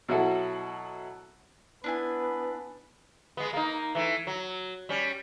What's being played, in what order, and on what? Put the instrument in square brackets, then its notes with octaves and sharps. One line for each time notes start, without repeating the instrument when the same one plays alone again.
[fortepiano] B2 F#3 E4 F#4 A4
[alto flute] B3 [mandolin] D4 E4 G#5 [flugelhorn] B4
[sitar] G#3 B3
A#3 D#4
E3 A3
F#3
G3 C#4